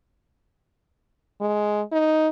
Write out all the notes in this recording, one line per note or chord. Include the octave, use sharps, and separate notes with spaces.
G#3
D#4